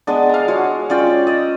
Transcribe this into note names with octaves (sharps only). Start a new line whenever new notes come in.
G#3 B3 D4
F5 A#5
G#3 F#4 C#5
C#4 F4 D5 G5
D#5 E6